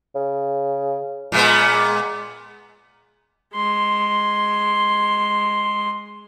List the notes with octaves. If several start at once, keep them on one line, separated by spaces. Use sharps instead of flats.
C#3
A#2 G#3 B3
G#3 C6